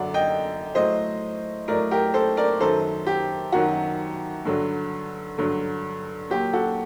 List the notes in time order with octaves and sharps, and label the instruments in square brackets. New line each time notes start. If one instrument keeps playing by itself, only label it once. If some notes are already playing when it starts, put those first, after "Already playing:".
Already playing: [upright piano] F#2 D3 F#3 D5 F#5
D#5 G5
A2 F#3 C5 D#5
A2 F#3 A#4 D5
G4 A#4
A4 C5
A#4 D5
F#2 D#3 F#3 A4 C5
G4
F#2 D#3 F#3 F#4
G2 D3 F#3
G2 D3 F#3
A#2 F#3 G4
F#4 A4